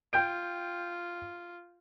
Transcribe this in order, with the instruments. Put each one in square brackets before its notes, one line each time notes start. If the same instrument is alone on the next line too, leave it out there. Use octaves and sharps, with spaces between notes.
[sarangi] F4 [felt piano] G5 G6 D7